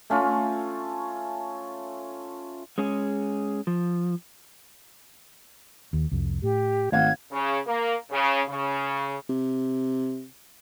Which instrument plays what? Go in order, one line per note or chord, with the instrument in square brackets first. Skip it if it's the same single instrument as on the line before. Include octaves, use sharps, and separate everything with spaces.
[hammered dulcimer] A3 C#4 F4
[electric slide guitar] G#3 C#4 G#4
F3
[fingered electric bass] D#2
C2 F2
[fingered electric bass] A2 [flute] G4
[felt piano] G#1 F5 F#5 [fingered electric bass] A3 [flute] G#6
[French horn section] C#3
A#3
C#3
C#3
[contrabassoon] C3